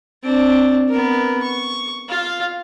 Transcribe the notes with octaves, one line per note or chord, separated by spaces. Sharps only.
C4 D4
B3 A#4
C#6
F4 F5